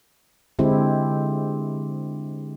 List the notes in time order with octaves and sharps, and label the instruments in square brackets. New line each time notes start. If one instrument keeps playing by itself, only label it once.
[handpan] D3 G#3 C4 E4 G4